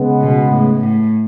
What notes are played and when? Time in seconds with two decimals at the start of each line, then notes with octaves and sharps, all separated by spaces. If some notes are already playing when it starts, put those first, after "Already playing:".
Already playing: C#3 G#3 B3
0.21 B2
0.50 A2
0.80 A2